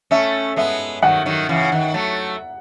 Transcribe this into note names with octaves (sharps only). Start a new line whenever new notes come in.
A3 C#4 E5
G#3 B3 E5
D#3 F#3 F#5
D#3 F#3
C#3 E3
D#3
F#3 A3